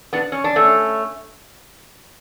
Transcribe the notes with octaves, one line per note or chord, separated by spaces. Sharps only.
B3 D4
C#4
D4
A3 C#4